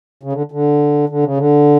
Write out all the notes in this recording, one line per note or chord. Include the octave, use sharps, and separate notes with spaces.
C#3
D3
D3
D3
C#3
D3